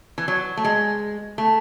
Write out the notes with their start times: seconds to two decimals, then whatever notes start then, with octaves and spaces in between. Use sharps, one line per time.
0.18 E3
0.28 F#3
0.57 A3
0.64 G#3
1.38 A3